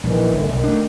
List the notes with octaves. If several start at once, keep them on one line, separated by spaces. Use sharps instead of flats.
A#1 D#3 E3
G1 D3 D#3 A3
B1 D#3
A3 D4